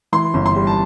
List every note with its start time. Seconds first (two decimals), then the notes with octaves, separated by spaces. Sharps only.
0.13 E3 C6
0.34 G1
0.46 C6
0.56 G3
0.67 A5